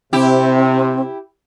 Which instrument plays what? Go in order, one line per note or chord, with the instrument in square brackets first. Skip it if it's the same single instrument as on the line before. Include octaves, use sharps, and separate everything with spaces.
[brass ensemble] C3 [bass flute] C4 [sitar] E4 G4